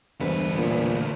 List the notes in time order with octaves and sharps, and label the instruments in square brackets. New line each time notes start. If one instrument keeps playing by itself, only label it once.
[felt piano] E1 G2 C5 [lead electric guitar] D2 B4
[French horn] A#2